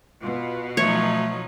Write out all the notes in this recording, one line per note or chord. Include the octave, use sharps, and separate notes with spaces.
B2 F4
F3 F#3 A3 D#4 C#5